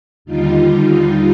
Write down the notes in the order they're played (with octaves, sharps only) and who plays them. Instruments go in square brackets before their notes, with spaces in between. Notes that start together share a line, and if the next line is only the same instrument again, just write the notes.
[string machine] D#2 D3 G3 D#4 F4